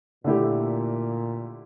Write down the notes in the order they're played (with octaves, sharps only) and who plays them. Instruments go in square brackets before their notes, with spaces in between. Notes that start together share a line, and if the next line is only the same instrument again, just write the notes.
[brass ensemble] A#2 [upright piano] D3 A3 E4 G4